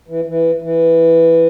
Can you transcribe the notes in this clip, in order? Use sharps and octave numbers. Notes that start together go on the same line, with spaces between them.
E3
E3
E3